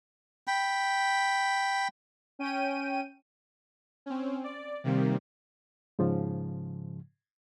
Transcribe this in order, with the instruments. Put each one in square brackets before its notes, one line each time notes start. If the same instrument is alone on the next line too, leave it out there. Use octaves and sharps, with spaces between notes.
[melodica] G5 B5
[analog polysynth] C#4 G5 D#7
[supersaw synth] C4 C#4
D5
C3 D#3 G3 A#3 C4
[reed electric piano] G#2 C#3 F3